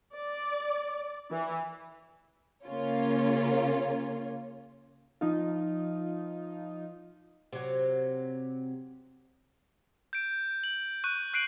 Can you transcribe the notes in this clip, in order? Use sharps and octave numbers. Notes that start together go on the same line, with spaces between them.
D5
E3
C#3 A#3 C#4 F4 C#5
F3 D#4 F4
C3 F#3
G6 D7
F#7
C#6 F#6 D#7
F#6 C7 D7 D#7 F#7